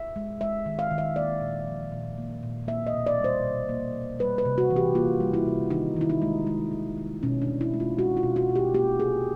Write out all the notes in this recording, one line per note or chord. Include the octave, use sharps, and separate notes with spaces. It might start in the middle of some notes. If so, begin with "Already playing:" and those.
Already playing: E5
G#3
G#3 E5
D#3
F5
D#3
E5
A#3 D5
A#2
F3
A#2
A#3
A#2
A#3 E5
D#5
B2
D5
G3
C5
B2
A#3
B2
G3 B4
B4
C3
F#4
E3
G4
A#3 F4
G3
E4
C3
D#3 D#4
D#3 E4
D#4
G#3
G#3
D#3
D#3
B2 C#4
D4
B2
E4
G#3
F4
G#3 F#4
F4
B2
F#4
B2
G4
A#3 G4
C3 G#4